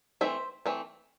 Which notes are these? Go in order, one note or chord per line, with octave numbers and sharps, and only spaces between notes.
E3 A3 C4 C5 E5
E3 A3 C4